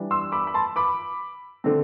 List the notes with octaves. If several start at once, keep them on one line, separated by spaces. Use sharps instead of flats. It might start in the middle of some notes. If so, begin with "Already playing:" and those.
Already playing: E3 G3 D4
C6 E6
B5 D6
B5
A5 C6
B5 D6
D3 A3 C4